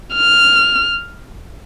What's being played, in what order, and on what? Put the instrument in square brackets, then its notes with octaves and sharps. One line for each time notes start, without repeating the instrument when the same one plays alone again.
[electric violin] F6